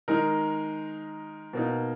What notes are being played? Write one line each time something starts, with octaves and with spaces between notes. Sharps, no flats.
D#3 G#3 D#4 A#4
B2 A#3 D#4